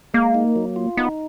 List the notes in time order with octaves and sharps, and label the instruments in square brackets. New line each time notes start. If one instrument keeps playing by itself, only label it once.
[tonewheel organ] G#3 [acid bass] A#3
[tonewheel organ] D#4
F#3
F4
[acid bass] B3 [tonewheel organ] D#4